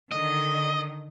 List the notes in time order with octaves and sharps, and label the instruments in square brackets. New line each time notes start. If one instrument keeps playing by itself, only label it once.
[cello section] D3 D#3 [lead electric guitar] D#5